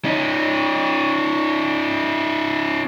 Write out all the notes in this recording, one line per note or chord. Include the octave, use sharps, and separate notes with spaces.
C#4 D#4